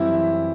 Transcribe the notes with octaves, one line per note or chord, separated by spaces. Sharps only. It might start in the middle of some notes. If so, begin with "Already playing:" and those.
Already playing: F#2 E3 G3 C4 E4 E5